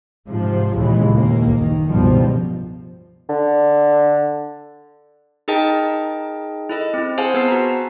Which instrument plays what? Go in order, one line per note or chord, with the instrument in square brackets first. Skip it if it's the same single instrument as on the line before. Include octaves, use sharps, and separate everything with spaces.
[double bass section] G#2 C3 F3
D#2 A#2 C#3 E3 G#3
D#2 A#2 A#3
F#1 D#3
C#2 G2 B2 D#3 F3 G3
[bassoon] D3
[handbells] D#4 G#4 A#4 D#5 G5 A5
E4 A4 D#5
C4 E4
G#4 C5 F5 F#5 G#5 A5
B3 B4 C5 A5 E6 C7
F#4 A#5